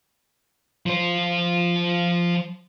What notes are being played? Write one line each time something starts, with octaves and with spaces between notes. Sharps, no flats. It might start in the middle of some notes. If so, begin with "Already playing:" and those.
F3 C5